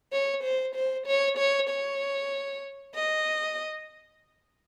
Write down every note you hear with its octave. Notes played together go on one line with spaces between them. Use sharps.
C#5
C5
C5
C#5
C#5
C#5
D#5